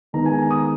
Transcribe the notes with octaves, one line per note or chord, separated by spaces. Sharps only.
D#3 G#3 B3 A#5
G#5
A#5
D#6